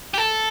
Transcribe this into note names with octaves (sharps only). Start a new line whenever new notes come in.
G4
A4